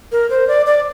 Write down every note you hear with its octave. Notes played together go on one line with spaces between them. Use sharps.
A#4
C5
D5
D5